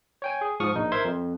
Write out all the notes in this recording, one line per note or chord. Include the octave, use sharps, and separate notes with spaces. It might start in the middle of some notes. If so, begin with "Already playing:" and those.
C#5 G5 G#5
G#4
G#2 F3 C#6 D#6 F6
A#1 D#4
A#4 C5 E5 C6 G#6
F2